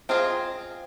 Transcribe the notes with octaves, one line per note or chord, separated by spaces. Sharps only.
C4 F4 G#4 D#5